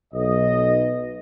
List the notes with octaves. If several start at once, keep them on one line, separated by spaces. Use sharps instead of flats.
B1 D#5